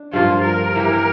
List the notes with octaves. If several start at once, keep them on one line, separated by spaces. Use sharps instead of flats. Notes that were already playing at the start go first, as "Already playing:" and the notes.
Already playing: D4
G2 F3 A#3 F4
A#4
E3 A#3 E4 G4